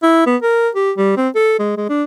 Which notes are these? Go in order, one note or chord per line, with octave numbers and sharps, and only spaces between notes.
E4
B3
A#4
G4
G3
C4
A4
G#3
G#3
D4